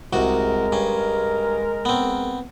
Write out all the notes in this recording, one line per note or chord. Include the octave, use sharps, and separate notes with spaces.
C2 G#3 F#4 A#4
G2 C#4
B3 C4